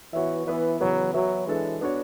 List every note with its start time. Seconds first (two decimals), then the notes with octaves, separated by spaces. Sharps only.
0.13 E3 B3 F#4 C#5 E5
0.47 E3 B3 E4 B4 E5
0.81 C#3 E3 F#3 B3
1.13 F#3 B3 F#4 B4 E5
1.47 E3 G#3 D4 A4
1.81 B3 D4 F#4 C#5